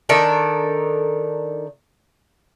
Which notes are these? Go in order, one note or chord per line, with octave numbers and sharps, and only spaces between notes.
D#3 D4 A4 A#4